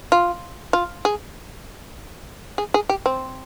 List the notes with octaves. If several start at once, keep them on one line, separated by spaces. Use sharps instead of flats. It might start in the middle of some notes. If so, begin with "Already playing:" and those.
F4
F4
G#4
G#4
G#4
G4
C4